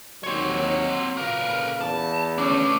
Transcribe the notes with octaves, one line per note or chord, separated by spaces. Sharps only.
D#2 F#3 C4 C#5
A#2 C#3 A#4 B4 F5
E2 A5
A3 C#4 D4